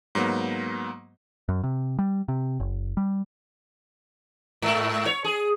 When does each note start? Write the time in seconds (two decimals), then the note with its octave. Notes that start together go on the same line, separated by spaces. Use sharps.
0.15 G#2 F#3 A#3 B3
1.49 F#2
1.63 C3
1.99 G3
2.28 C3
2.60 F#1
2.97 G3
4.62 G#2
5.06 C#5
5.24 G#4